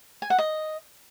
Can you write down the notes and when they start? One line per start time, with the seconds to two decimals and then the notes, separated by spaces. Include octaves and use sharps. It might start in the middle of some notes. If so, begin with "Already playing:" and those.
0.22 G#5
0.30 F#5
0.38 D#5